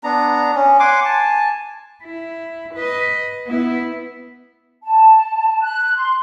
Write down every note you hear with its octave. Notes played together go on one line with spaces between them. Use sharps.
B3 D4 A#5
C#4
F#5 G#5 C6 D6
G#5 A5
E4
B4 D#5
B3 E4
A5
F#6
C6